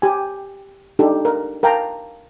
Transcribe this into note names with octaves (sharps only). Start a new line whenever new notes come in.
G4 G#5
D4 D#4 G4 A4
A#4
A#4 F5 G5 A5 A#5